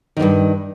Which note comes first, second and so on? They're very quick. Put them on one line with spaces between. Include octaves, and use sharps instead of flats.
D#3 E2 G2